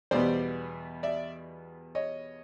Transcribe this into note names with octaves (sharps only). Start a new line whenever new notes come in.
E2 B2 G3 B3 C5 D5
D5 E5
C#5 D#5